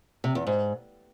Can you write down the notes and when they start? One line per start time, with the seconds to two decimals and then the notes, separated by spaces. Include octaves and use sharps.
0.24 C3
0.35 E2
0.47 G#2